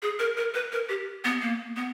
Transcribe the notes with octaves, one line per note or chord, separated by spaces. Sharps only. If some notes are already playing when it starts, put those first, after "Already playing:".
G#4
A#4
A#4
B4
A#4
G4
B3
A#3
B3